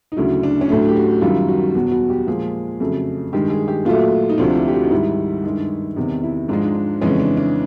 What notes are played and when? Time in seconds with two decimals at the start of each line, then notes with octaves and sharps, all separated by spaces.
0.12 D#4
0.16 D2 C#3 F#3 E4
0.43 D4
0.61 C#4
0.69 A2 F#3 A3 D4
0.89 G4
0.96 F#4
1.21 F#2 D#3 G3 F4
1.49 F#4
1.75 E2 B2 F#3 F#4
1.92 F#4
2.10 G4
2.27 A#2 F3 G#3 G#4
2.80 F2 C#3 F#3 A3
3.33 G2 D#3 G#3 G4
3.50 G#4
3.68 G4
3.85 A#2 F#3 A3 F4
4.29 D#4
4.38 D2 C3 F3 D4
4.55 E4
4.68 G4
4.74 F#4
4.85 D#4
4.90 G#2 D#3 G3 E4
5.44 G2 D#3 G#3
5.96 E2 C3 D#3 D#4
6.23 E4
6.49 G#2 F3 G#3 D4
6.62 D#4
6.75 D4
7.01 F2 C#3 E3 G#3 C#4
7.20 D4
7.37 D4